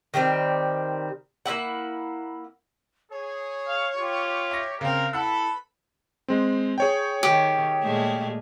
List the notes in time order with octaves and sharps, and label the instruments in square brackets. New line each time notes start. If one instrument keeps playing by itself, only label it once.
[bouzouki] D#3 G3 A3 C4
A#3 C#4 E4 F#5
[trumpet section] G#4 [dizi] C#5
[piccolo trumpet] F5
[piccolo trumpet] F4 [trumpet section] G4
[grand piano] E5 A#6
[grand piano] C#3 C4 [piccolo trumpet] A#4 [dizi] F5
[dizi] E4 [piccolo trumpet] A4 [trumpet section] B4 B5 [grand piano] F#5 E6
[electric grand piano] G#3 C4
G#4 C#5 G5
[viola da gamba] D#3 [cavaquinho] G4
[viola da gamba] A#2 G#3 A3